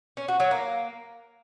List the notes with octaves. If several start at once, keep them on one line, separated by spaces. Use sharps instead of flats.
C#4
F#4
F#3
A#3